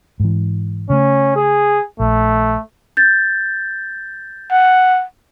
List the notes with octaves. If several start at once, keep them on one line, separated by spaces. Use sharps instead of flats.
G#2 E3
C#3 A3 C#4
G#4
A#1 A3
G6 A6
F#5